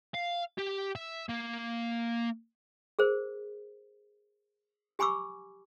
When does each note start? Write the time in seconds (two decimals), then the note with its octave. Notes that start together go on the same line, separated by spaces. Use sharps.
0.14 F5
0.58 G4
0.96 E5
1.29 A#3
2.99 G#4 A#4 C5
4.99 G4 G#5 B5 C#6 D6 E6